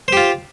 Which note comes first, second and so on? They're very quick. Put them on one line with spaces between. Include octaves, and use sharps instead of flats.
C5 G4 F4